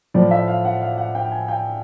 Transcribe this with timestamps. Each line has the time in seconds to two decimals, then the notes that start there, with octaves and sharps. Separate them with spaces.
0.14 A2 F3 D5
0.31 E5
0.48 F5
0.65 F#5
0.81 F5
0.98 F#5
1.15 G5
1.32 G#5
1.48 G5